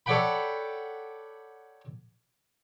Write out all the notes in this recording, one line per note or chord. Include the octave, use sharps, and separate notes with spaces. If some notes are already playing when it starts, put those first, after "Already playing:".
A4 C#5 D5 F#5 G5 B5